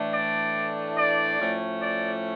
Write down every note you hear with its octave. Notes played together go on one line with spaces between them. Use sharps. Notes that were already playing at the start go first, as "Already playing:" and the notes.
Already playing: A2 E3 A3 D4
D5
D5
A2 F3 A3 C#4
D5